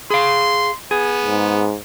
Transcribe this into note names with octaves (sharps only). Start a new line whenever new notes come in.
G#4 F5 C6
B3 G#4
G#2